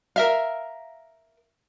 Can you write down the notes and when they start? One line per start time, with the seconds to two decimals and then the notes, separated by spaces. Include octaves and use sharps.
0.16 A#4 E5 F5